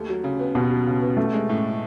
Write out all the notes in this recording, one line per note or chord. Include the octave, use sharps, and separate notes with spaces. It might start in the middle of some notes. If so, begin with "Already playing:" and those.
Already playing: D#2 A3
F#3
C#3
B3
D#2 B2
F#3
C#3
B3
A1 A3
G#3
A2